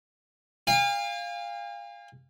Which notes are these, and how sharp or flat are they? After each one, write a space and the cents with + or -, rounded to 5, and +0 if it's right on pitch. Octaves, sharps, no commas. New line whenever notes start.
F5 +0 G#5 -45